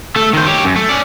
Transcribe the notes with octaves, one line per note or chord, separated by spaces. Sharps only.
A3 A4
D#3 C5
G4 C#5
F#2
A3
C#4 D5